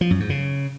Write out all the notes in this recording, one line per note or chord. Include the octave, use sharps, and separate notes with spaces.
F3
F#2
G#2
C#3